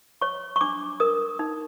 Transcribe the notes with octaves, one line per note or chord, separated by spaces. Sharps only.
C#5 C#6
C#6
D4 D6
A#4 D#6
D#4